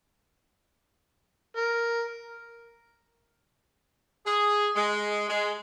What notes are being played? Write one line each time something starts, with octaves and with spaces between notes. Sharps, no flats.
A#4
G#4
G#3
G#3